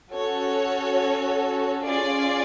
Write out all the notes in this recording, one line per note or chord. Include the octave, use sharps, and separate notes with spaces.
C#4 F#4 A4 C#5
C#4 F4 G#4 D5